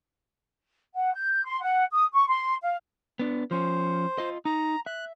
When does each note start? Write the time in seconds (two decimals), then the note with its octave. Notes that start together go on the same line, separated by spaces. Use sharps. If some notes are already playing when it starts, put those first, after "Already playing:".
0.95 F#5
1.14 G6
1.45 C6
1.62 F#5
1.93 D#6
2.13 C#6
2.28 C6
2.62 F5
3.19 B3 D4
3.51 F3 C#4 C5
4.18 F4 D#5
4.45 D#4 A#5
4.86 E5 F#6